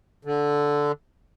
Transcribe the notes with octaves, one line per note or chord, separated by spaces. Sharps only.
D3